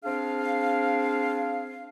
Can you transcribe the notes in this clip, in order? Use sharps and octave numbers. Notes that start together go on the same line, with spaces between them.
C4 D4 G#4 F5